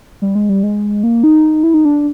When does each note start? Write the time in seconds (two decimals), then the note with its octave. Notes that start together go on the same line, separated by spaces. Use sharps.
0.22 G3
0.35 G#3
0.49 G3
0.63 G#3
1.04 A#3
1.24 D#4
1.63 E4
1.74 D#4
1.85 D4